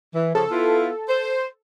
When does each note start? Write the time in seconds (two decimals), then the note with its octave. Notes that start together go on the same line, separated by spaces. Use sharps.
0.15 E3
0.35 C#3 F3 A4
0.51 B3 E4 F4
1.09 C5